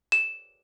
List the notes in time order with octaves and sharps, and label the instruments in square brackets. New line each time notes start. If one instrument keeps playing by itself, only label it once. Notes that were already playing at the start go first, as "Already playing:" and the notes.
[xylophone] E7